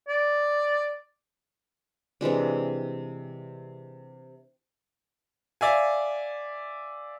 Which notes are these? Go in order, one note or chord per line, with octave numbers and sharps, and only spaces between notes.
D5
C3 E3 G#3 D4
D5 E5 F5 G#5